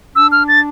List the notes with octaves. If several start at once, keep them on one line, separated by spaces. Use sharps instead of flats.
D4 E6
F6
A6